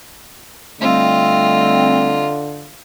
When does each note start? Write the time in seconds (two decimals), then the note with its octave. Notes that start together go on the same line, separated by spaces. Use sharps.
0.81 D3 G3 A3 C4 F4 D#5